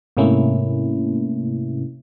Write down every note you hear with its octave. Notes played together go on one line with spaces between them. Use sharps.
G#2 C3 A3 A#3 C#4 E4